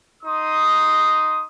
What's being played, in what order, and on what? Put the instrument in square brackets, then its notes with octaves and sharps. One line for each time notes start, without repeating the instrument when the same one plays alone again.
[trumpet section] D#4 C6 D#6